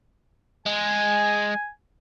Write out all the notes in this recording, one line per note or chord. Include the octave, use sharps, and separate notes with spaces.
G#3 G#5